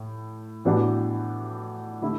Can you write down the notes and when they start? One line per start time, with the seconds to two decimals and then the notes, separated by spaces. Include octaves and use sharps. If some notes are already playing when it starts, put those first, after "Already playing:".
Already playing: A2
0.65 A2 E3 B3 D4 F#4
2.02 D3 A3 E4